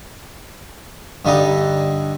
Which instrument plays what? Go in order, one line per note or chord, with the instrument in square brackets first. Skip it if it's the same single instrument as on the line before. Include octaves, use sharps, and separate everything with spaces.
[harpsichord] G2 D3 G3 D#4